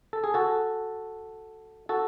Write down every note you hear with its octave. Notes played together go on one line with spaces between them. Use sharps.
A4
G#4
F#4 A4
F#4 A4